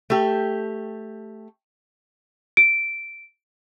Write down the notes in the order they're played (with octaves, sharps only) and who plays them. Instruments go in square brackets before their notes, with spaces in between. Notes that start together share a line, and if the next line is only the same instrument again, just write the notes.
[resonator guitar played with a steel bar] A3 G4
[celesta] D7